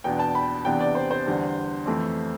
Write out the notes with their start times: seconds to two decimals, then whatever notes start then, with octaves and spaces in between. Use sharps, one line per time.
0.04 E2 B2 B3 D4 G5
0.20 A5
0.35 B5
0.65 E2 C3 E3 B3 D4 G5
0.81 D5
0.95 C5
1.11 C5
1.26 E2 D3 G3 D4
1.86 F2 E3 A3 C4